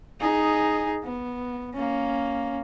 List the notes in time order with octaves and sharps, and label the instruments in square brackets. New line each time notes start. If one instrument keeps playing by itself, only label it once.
[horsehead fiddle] D#4 G#4
B3
A#3 C#4